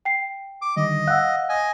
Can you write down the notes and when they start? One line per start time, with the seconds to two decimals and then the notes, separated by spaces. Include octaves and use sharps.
0.05 G5 C7
0.62 D6
0.77 D3 D#3 G3 D#5
1.07 F5 F#5 E6 F#6
1.49 D#5 G#5